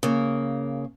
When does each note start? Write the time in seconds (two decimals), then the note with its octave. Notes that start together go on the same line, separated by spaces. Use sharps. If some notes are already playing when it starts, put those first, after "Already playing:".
0.03 C#3 A#3